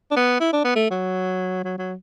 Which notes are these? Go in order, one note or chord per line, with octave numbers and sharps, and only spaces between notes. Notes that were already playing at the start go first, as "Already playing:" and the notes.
D4
B3
E4
D4
B3
A3
F#3
F#3
F#3